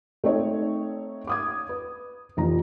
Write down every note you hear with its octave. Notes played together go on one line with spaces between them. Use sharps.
A3 C4 D#4 C#5
D6 D#6 G#6
B4
F1 F2 E3 A#5